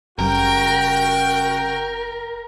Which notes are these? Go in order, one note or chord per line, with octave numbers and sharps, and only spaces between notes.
F#1 C#3 G3 F#4 A#4 G5